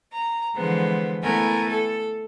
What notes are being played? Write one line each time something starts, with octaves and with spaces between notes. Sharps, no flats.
A#5
D3 E3 F3 G#3 B3 C5
A3 B3 E4 A#4 G#5
A4